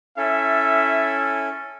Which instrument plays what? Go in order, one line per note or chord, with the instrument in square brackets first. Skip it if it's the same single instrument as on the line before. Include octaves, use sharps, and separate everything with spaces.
[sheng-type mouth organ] C#4 E4 A4 [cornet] E5